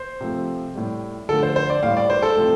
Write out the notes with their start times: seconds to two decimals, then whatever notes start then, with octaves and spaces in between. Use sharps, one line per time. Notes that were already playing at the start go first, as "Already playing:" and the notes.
Already playing: C5
0.21 C3 F3 A3
0.75 A2 G3
1.29 D3 F3 A3 A4
1.43 C5
1.56 C5
1.70 D5
1.83 A2 G3 F5
1.97 D5
2.10 C5
2.22 A4
2.37 C3 F3 A3